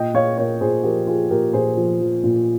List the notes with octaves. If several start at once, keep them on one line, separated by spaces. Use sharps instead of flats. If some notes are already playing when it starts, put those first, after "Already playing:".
Already playing: A#2 D#5 G5
A#2 C#5 F5
A#2 A#4 C#5
A#2 G#4 C5
F3 G4 A#4
F3 F4 G#4
A#2 G4 A#4
A#2 G#4 C5
F3
F3
A#2